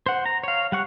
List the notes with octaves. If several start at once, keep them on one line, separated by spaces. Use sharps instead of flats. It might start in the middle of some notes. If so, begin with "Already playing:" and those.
C5 F#5
A#5
C#5 F5
G3 F#5 C#6 F#6